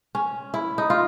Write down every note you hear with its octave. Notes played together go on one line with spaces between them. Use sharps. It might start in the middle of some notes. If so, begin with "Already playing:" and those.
C#4
E4
D#4
F4